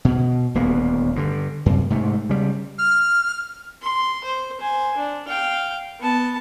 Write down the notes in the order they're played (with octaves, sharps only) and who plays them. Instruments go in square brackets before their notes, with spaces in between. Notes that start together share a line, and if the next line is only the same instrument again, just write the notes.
[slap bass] B2
D#1 D2 A#3 B3
G2 D3
F#2 C3
G#2 C3 A3
C#3 G3
[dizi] F6
[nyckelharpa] C6
C5
C5 G#5
D4
F5 G5
B3 A5